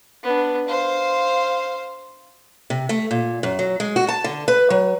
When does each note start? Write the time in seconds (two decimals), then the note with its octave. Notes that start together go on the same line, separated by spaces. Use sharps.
0.23 B3 D4
0.68 C5 F5
2.70 C3
2.89 A3
3.11 A#2
3.43 F#2
3.59 F#3
3.80 G#3
3.96 F#4
4.09 A5
4.24 D3
4.48 B4
4.70 F#3